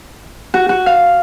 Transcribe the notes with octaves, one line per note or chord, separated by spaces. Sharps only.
F#4
F#4
F5